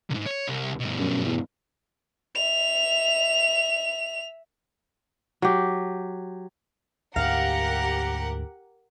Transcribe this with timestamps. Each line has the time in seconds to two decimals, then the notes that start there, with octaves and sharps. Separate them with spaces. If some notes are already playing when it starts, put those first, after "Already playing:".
0.10 C2 G#2
0.26 C#5
0.48 C2
0.80 G2 B2
0.99 F#2
1.25 E2
2.35 E5 F7
5.42 F#3 G4
7.16 D2 G#2 G4 A#4 F5 F#5 A#5